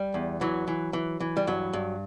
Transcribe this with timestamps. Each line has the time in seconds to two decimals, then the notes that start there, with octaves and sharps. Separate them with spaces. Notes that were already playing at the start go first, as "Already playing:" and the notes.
Already playing: G3
0.14 E2
0.41 E3 F#3
0.68 E3
0.93 E3
1.20 E3
1.37 G3
1.47 G2 F#3
1.73 G2